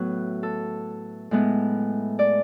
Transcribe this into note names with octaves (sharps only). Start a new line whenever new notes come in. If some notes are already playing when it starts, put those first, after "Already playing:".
Already playing: A2 F#3 B3 B4
A4
A2 G#3 B3
D5